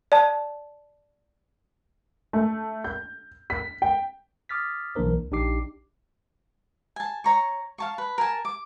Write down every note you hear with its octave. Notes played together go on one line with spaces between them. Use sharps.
D5 A5
A3
G6
B6
G5
D6 D#6 F6 A6 B6
B1 E3 A#3 D4 A#4 C5
C#2
A#1 D4 D#4 G4 D6 C7
G#5 A5
C#5 A#5 C#6
F5 A5 C#6
B4
A#4 G#5 A5
D6